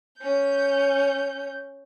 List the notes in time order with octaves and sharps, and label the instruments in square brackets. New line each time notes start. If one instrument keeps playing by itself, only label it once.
[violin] C#4 G6